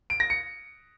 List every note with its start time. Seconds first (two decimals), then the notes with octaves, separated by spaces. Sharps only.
0.10 D7
0.20 A#6
0.30 C#7